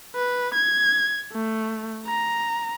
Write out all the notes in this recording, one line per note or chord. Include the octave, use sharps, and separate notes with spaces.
B4
G#6
A3
A#5